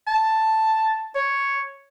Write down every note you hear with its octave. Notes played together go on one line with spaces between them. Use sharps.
A5
C#5